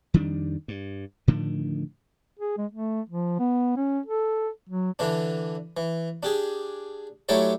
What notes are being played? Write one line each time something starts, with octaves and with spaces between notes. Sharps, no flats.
F2 D#3 G3 D4
G2
A2 D3 D#3 F3
G#4
G#3
A3
F3
B3
C#4
A4
F#3
D3 E3 D4
E3
D4 G4 G#4
F#3 A3 E4 G4 C#5 D5